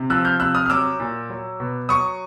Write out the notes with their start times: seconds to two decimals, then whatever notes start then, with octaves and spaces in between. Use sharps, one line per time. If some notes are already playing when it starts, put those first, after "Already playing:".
Already playing: C3
0.10 F3 E6 F#6
0.25 F6 G6
0.40 C3 E6 F#6
0.55 D#6 F6
0.66 F6
0.70 F#3 D6 E6
1.00 A#2
1.30 F#3
1.60 B2
1.89 F#3 C#6 D#6